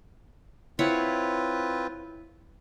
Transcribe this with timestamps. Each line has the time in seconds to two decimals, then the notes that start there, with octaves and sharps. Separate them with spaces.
0.79 C4 E4 F4 B4 C#5 F#5